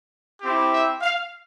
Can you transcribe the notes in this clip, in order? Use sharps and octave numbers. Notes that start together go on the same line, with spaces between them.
C4 E4 G4
E5
F5